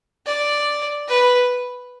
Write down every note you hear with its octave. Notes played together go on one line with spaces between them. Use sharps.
D5
B4